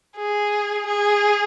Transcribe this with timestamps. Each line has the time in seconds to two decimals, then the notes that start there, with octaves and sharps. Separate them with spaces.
0.17 G#4
0.86 G#4